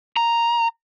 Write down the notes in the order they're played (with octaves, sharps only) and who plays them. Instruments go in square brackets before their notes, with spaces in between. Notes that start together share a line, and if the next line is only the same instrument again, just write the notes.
[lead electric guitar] A#5